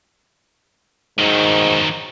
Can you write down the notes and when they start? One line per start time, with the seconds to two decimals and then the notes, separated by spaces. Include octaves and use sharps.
1.19 G#2 D#3 F#3